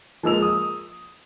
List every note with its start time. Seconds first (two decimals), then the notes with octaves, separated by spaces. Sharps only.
0.23 F3 G#3 A#3 E6 F7
0.42 D#6